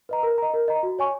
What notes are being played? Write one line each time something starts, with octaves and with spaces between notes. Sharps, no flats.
B4 D#5 A#5
A#4
D#5 A#5
A#4
D#5 A#5
F#4
C#5 G#5 C#6